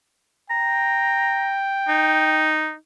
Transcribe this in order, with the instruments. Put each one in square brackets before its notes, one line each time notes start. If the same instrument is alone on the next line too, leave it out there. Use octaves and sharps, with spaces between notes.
[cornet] G5 [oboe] A#5
[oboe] D#4